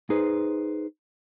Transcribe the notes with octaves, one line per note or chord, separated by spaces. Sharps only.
D#4 G#4 B4 C5